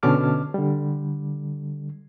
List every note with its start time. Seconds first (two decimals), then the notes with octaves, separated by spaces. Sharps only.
0.03 B2 D3 C#4 A5 D6 F6
0.54 D3 G3